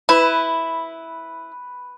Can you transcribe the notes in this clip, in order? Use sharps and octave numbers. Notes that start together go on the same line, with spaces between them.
E4 B4